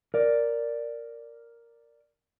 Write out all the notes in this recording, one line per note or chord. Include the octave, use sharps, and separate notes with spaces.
A#4 D5